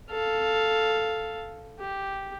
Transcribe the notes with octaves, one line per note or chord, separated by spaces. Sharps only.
A4 F5
G4